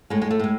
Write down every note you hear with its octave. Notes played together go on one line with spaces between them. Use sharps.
A2 G#3
G#3
A3
A2 G#3